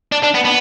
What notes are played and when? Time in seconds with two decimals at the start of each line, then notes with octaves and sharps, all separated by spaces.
0.12 D4
0.23 D4
0.34 B3
0.45 B3